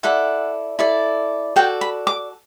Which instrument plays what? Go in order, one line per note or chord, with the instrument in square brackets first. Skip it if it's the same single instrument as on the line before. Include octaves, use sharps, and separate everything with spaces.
[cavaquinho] E4 A4 D5 F#5
E4 A4 D5
F#4 A4 D5 G5
B5
D6